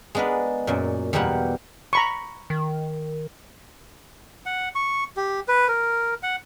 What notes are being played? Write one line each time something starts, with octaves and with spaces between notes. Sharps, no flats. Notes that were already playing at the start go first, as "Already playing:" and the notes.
G#3 B3 D4 A#4 B4
F#2 A#2
E2 B2 G3 A#3 G4 F#5
A#5 B5 C#6
D#3
F#5
C#6
G4
B4
A#4
F#5